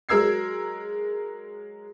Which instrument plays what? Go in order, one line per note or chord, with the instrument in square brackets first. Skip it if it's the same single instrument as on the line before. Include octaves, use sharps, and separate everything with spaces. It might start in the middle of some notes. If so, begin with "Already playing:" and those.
[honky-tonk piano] F#3 G#3 A#4 E6 G#6 C7